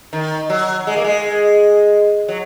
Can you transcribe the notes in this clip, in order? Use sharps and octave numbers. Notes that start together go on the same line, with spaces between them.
D#3
F#3
G#3
A#3
G#3
F#3